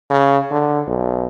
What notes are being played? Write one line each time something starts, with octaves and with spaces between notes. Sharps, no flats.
C#3
D3
B1